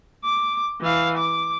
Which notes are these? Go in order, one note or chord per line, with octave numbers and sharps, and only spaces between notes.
D6
E3 F5
D6